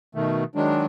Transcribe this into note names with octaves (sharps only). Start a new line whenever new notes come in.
B2 D#3 A3
D#3 F#3 G#3 D4